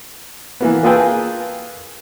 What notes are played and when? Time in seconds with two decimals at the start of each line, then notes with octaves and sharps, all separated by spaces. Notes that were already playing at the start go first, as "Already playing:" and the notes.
0.61 E3 A#3 B3
0.83 A#3 F4 G#4 A4 B4 G5